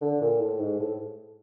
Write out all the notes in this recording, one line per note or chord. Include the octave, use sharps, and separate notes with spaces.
D3
A#2
A2
G#2
A2